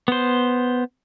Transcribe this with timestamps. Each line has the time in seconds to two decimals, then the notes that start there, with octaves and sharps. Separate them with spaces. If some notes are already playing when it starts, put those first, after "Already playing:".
0.08 B3 C5